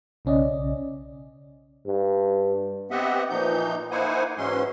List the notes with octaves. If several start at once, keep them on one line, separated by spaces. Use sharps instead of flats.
B1 C#3 C#4 D5 D#5
G2
B3 C4 G4 D#5 E5 F#5
A#2 E3 F3 D#4 G6
A#3 D#4 E4 C5 F#5 G#5
G#2 E3 F#3 G#3 C#4 C6